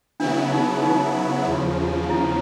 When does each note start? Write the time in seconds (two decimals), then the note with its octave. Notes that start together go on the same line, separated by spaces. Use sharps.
0.20 C#3 F#3 B3 D4 E4
0.52 D#4
0.83 D#4
1.47 E2 C#3 F3
2.10 E4